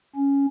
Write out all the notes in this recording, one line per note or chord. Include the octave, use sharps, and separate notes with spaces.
C#4